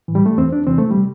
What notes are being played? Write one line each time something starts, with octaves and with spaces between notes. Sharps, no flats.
A2 E3
G3
A3
E2 E3 C4
D4
E2 C3 E3 C4
A3
G3
C3